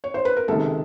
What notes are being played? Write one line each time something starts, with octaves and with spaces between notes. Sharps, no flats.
C#5
C5
B4
A#4
C#2 C3 D#3 G#3 A4